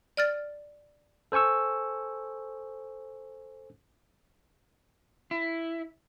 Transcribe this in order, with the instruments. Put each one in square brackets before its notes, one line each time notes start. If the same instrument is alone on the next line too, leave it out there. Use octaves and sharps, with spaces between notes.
[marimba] D5 F6 A6
[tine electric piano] A4 C5 G#5 C#6 E6
[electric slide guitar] E4